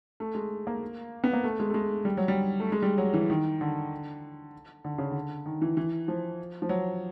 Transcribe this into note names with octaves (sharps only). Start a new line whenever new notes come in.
A3
G#3
A#3
B3
A#3
A3
G#3
A3
G#3
G3
F#3
G3
A3
G#3
G3
F#3
E3
D#3
D3
D3
C#3
D3
D#3
E3
E3
F3
F3
F#3